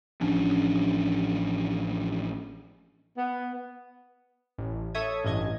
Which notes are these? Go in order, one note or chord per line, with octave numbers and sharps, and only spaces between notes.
A1 F3 C#4 D4
B3
A1
A4 C#5 E5 D#6 G#6
A1 G2 D#5 G#6